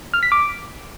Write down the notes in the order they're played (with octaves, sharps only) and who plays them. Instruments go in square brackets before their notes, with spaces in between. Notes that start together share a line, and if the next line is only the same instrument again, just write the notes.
[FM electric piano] F6
B6
D6